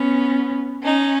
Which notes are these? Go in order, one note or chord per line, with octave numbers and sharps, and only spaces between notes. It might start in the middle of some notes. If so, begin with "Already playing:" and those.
Already playing: B3 C#4
C#4 D#4